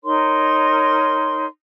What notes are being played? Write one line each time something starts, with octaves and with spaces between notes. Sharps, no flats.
D#4 A#4 C#5 C6